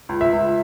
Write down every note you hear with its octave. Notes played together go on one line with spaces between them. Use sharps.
C#2
E5
C#2